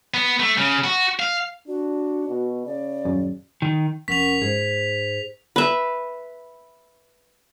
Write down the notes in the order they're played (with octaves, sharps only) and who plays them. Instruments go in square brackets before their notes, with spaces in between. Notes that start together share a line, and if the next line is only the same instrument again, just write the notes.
[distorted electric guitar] B3
A3
C#3
F#4
F5
[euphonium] D4 [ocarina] F#4
[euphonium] B2
[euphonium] C#3 [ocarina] D5
[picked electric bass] D#1 F#2
[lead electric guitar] D#3
[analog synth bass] F1 [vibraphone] C#4 A#4 F#5 [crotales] B6 F7
[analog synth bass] G#2 [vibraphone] G#4 C5
[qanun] B4 E5